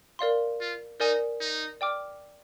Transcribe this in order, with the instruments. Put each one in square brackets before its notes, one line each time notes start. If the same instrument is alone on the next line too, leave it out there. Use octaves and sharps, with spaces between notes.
[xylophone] A#4 D5 F5 C6
[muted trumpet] F4
[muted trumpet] D#4 [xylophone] A#4 D5 G#5 D#6
[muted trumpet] D#4
[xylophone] D5 G5 D6 F6